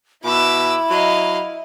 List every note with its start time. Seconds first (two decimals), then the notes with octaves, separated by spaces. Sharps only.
0.24 B2 E4 B5 D6 E6
0.91 F#3 D#5 F5